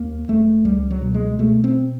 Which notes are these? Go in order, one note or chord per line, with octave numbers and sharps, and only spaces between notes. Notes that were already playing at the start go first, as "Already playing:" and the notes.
Already playing: D#2 A#3
F1 A3
C#2 G3
F#3
B2
G#3
B2 A3
C4